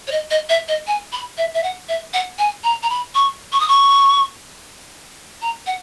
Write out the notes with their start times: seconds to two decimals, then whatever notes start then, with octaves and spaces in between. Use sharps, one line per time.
0.07 C#5
0.11 D#5
0.31 D#5
0.49 E5
0.68 D#5
0.87 G#5
1.13 B5
1.38 E5
1.54 E5
1.63 F#5
1.89 E5
2.14 F#5
2.39 G#5
2.64 A#5
2.83 A#5
2.90 B5
3.15 C#6
3.52 C#6
3.60 D#6
3.68 C#6
5.42 A#5
5.67 F#5